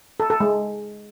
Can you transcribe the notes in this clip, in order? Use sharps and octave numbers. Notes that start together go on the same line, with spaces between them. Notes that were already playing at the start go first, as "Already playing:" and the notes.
A4
A4
G#3